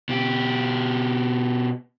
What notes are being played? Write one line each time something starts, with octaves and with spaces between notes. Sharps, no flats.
B2 G4